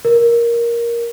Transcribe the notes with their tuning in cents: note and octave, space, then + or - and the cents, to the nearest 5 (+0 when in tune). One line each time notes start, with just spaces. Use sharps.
A#4 +10